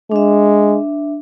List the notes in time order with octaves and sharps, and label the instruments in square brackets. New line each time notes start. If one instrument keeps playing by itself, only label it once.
[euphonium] G#3 [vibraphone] D4 E5